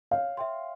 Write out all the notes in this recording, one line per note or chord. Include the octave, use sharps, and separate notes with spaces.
C#5 F5
E5 G5 C6